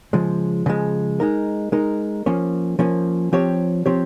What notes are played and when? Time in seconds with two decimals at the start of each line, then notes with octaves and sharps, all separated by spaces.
0.13 C#3 F3 G#3
0.66 C#3 F3 G#3
1.20 G#3 D#4 A#4
1.72 G#3 D#4 A#4
2.26 F3 A#3 C#4
2.79 F3 A#3 C#4
3.33 F3 C4 G4 C#5
3.86 F3 C4 G4 C#5